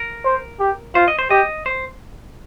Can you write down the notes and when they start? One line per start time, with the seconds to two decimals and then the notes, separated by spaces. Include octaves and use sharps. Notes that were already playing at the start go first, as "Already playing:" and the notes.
Already playing: A#4
0.25 C5
0.60 G4
0.95 F4 C5
1.08 D#5
1.19 C5
1.30 G4 D#5
1.66 C5